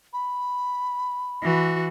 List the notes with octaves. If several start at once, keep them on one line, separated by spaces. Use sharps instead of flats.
B5
E3 F#4